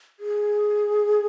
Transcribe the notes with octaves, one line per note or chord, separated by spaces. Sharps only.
G#4